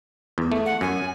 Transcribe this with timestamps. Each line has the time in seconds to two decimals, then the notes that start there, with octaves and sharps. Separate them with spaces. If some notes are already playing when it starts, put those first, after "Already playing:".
0.38 E2
0.52 A3
0.66 F#5
0.81 F#2 G#5